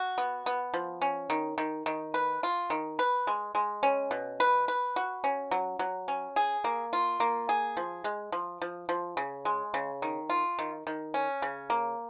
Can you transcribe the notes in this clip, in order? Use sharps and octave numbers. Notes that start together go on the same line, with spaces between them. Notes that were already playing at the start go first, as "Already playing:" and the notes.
Already playing: F#4
B3
B3
F3
C#4
D#3
D#3
D#3
B4
F4
D#3
B4
G#3
G#3
C#4
B2
B4
B4
F#4
C#4
F#3
F#3
C#4
G#4
A#3
F4
A#3
G#4
F3
G#3
F3
F3
F3
C#3
G#3
C#3
D#3
F4
D#3
D#3
C#4
C#3
A#3